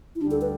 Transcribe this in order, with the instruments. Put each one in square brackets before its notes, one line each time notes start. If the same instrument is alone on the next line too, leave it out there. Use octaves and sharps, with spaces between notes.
[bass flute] E4
[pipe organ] D2 D3 G3 [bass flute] D4
[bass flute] A4
B4